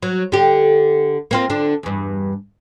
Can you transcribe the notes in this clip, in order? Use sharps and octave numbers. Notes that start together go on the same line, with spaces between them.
F#3
D3 G4
A#3 C4 F4
D3 D4
E2 G2